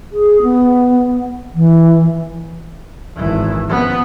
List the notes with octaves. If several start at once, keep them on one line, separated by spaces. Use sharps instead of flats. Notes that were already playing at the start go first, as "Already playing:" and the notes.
G#4
B3
E3
G#1 E3
F3 B3